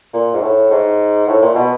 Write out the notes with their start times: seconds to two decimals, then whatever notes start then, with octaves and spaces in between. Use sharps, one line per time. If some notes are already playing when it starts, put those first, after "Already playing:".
0.14 A#2
0.34 G#2
0.42 A2
0.70 G#2
1.28 A2
1.42 A#2
1.55 B2